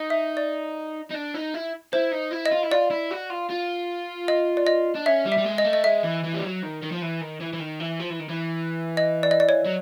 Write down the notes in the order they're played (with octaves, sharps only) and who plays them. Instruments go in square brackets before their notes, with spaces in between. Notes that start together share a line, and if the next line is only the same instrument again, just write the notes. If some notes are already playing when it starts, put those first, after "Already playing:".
Already playing: [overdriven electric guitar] D#4
[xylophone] E5
D5
[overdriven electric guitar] D#4
D4
D#4
E4
[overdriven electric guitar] E4 [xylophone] C5
[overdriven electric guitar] D#4
E4
[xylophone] D#5
[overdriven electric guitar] F4
E4
[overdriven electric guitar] F4 [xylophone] D5
[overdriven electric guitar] E4
F#4
F4
F4
[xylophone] D#5
D5
D#5
[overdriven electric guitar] D4
[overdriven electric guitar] C#4 [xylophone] E5
[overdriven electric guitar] G3
[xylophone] E5
[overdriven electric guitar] G3
G#3
[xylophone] D#5
[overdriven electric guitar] A3
[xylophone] D#5
[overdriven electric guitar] G#3 [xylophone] E5
[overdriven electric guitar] E3
E3
G3
F#3
D#3
D#3
F3
E3
D#3
E3
E3
D#3
E3
F3
E3
D#3
E3
[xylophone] D#5
D5
D#5
D5
C#5
[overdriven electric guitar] F#3